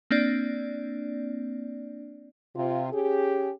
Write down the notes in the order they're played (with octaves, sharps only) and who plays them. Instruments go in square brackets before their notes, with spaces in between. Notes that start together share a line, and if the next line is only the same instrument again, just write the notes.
[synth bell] A#3 C4 D4 D5
[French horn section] C3 F4
C#4 G4 G#4